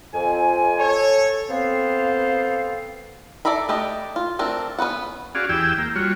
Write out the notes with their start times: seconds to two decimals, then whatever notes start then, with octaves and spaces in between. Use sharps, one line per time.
0.13 F2 G#5
0.78 A4 C#5
1.49 B3 C4 A4 C5 F5
3.45 A4 D5 E5 A#5 B5
3.69 A3 D4 G4 D#5
4.16 F4
4.39 A3 C4 D4 A#4
4.79 B3 C#4 B4 F#5
5.35 C#4 F#4 G#4 D5 F5
5.49 E2 G4 G#4 G5 E6
5.78 A#3
5.95 G3 F4 F#4 C#5